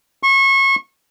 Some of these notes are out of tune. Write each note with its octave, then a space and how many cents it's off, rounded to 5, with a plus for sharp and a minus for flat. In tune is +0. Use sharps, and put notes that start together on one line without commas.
C#6 -30